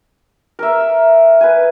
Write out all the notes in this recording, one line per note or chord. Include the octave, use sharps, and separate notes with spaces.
A#4 E5
B4 G#5